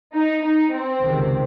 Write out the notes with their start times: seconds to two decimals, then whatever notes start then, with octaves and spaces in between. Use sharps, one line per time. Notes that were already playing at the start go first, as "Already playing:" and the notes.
0.13 D#4
0.42 D#4
0.72 C4
1.01 C#2 C3 D#3